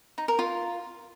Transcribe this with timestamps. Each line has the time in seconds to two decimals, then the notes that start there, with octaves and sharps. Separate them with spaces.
0.18 D#4
0.28 A#4
0.39 F4